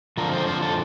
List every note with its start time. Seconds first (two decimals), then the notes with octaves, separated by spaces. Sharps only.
0.17 F2 D3 F3 A#4
0.33 C5
0.47 C5
0.63 A4